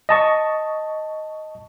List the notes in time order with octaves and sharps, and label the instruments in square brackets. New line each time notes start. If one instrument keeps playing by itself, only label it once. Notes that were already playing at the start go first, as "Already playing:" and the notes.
[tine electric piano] D#5 A5 C#6